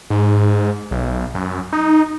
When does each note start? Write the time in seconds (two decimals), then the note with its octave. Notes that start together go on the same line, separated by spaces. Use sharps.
0.10 G#2
0.91 B1
1.35 F#2
1.73 D#4